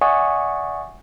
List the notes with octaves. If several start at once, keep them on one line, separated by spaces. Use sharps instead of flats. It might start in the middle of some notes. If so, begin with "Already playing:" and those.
D5 E5 F#5 G#5 C#6 D#6